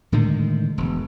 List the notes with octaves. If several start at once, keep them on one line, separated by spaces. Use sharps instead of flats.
A2 D3 D#3 G#3
E1